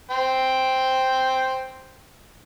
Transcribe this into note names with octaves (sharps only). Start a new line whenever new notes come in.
C5 G5